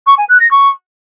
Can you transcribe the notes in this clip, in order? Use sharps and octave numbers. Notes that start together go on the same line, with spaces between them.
C#6
G#5
F#6
A#6
C#6